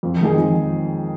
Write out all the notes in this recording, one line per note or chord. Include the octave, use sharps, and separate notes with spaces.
F2
D#3 G#3 D#4 G#4
F2